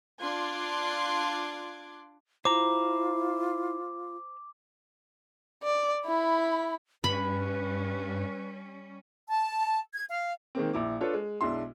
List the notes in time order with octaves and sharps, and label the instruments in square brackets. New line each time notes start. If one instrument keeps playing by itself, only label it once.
[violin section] D4 F4 C6 D6 F#6 G#6
[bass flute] E4 [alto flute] F4 [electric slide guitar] C5 A#5 [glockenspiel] D6
[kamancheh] D5
E4 B5
[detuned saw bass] G2 [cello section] G3 C#4 [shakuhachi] B4 [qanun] B5
[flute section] A5
G#6
F5
[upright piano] D#3 G#3 A#3 C4
A#1 E4 D6
D4 F4 A4 B4 C#5
G#3
B1 G#3 D4 E4 C6